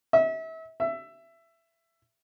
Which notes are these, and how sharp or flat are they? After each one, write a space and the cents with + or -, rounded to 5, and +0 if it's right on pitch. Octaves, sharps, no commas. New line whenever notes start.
E5 -35
E5 +15